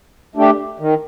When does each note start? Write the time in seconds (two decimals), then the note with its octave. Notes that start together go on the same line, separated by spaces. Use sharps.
0.36 A3 D4 G4
0.79 D#3